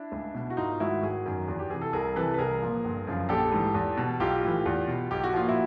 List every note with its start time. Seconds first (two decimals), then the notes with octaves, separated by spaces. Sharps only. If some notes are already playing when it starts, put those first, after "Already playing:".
Already playing: D4 E4
0.12 C#2
0.34 B2
0.50 F#4
0.57 G#1 D#4 F4
0.80 G#2 D#3 E4 F#4
1.02 G#1 F#4 G#4
1.26 F#2 D#3
1.48 E2
1.59 G4
1.70 C3 E3 G#4
1.81 A4
1.93 C2 G#4 A#4
2.16 C3 E3 A4 B4
2.34 B4
2.38 C2 G#4 A#4
2.61 A#2 F3
2.85 G1
3.07 F#2 C#3 F3
3.29 A#1 G4 A4
3.52 G#2 E3
3.74 E2
3.97 B2
4.20 B1 F4 G4
4.43 A2 E3
4.66 E2
4.88 B2
5.11 B1 G4
5.24 F#4
5.33 A#2 F3 F4
5.47 E4 F#4